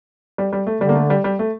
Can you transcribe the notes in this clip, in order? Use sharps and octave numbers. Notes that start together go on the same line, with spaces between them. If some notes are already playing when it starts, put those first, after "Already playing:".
G3
G3
A3
D3 G3
A#3
A3
G3
G3
A3